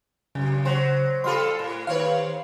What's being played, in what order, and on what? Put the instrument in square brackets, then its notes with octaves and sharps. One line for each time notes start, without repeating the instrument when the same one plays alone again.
[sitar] F#2 [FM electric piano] C#3
[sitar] F#3 C5
[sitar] G3 F4 A4 [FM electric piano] C6
[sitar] A2
[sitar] D#2 C4 C#5 [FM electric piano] B4 F5